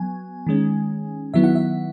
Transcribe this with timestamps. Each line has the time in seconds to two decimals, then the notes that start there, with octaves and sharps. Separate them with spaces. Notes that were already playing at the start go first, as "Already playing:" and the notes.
Already playing: F#3 B3 G#5
0.47 D#3 G#3 C#4
1.34 D#3 F#3 B3 E4 E5
1.44 F#5
1.55 E5